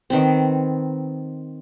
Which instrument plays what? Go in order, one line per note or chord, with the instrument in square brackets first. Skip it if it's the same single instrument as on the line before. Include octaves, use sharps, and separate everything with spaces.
[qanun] D#3 B3 C4